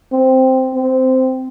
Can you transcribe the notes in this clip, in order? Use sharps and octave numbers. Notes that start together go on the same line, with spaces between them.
C4
C4